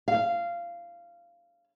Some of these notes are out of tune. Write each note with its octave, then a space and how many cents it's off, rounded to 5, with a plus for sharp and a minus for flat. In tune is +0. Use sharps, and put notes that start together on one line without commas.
F5 -15